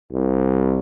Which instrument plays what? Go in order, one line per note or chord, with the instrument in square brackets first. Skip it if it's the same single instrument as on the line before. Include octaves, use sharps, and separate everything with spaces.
[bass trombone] C2